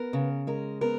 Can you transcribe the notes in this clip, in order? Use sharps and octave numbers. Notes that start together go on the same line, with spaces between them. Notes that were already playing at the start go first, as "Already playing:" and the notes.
Already playing: B3 A#4
C#3
G#3 A#4
B3 A#4